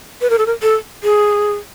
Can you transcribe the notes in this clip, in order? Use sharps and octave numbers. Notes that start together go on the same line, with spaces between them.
B4
A#4
A4
A#4
A4
G#4